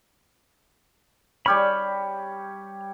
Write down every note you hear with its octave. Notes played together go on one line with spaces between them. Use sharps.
G3 G4 C#5 B5 F6